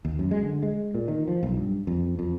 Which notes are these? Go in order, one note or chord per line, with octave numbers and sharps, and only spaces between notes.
D#2
F#2
G#3
D3
G#3
A#2
D#3
F3
B1
G2
F2
F2